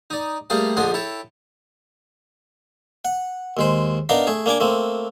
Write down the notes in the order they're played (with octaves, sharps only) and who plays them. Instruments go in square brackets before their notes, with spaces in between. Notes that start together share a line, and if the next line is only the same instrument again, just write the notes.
[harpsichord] D#4 D5
G3 A3 A#3 G#4 C5 F5
A#1 D3 F3 D#5 G#5 C6
E4 A4 C#5 G5
F#5
D#2 G#3 C5
B3 D4 D#4 A#4 F5 A#5
A3 G#4
A#3 D4 G#5 D6
A3 A#3 C4